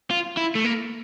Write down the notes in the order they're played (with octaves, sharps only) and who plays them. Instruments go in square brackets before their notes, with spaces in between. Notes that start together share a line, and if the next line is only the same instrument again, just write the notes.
[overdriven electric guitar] F4
E4
A3
A#3